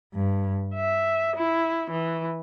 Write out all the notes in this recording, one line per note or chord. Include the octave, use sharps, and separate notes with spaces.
G2
E5
E4
E3